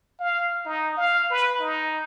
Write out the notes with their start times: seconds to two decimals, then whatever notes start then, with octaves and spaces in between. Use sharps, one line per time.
0.20 F5
0.65 D#4
0.97 F5
1.31 B4
1.61 D#4